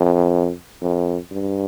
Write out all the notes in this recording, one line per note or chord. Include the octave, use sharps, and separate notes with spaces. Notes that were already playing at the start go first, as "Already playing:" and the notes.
Already playing: F2
F2
G2